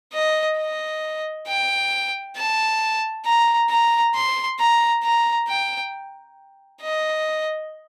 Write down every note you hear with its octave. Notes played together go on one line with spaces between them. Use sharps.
D#5
D#5
G5
A5
A#5
A#5
C6
A#5
A#5
G5
D#5